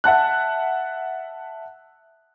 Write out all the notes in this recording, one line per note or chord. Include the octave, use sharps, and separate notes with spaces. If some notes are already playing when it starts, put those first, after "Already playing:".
E5 F#5 A5 F#6